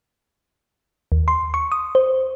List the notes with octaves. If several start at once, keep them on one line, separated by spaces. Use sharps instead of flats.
D#2
C6
C#6
D#6
C5